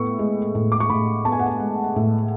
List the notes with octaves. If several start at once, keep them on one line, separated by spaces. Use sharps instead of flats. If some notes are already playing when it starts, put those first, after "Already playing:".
Already playing: A2 B3 C#6
G#3
A2
D6
C#6
A2 B5
B3 A5
G#5
F#5
G#5
G#3
A2